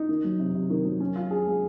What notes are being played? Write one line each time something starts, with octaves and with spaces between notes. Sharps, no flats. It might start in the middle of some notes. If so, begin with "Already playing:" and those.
Already playing: D#4
D#3
F#3
C3
C3
D#3
F#3
C#4
F4
G#4
G#3